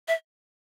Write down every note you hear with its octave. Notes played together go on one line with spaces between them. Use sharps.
E5